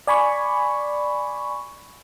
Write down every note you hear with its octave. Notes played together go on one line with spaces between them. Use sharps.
D5 G#5 B5 C#6